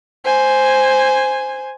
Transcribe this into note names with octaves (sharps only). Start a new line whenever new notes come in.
C5 G#5